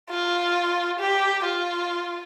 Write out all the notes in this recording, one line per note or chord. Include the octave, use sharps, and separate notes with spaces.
F4
G4
F4